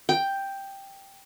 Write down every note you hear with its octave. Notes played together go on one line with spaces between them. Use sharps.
G5